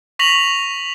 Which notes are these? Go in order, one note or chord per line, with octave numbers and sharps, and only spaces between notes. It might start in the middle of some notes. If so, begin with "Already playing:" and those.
C#6 A#6 B6 F7 F#7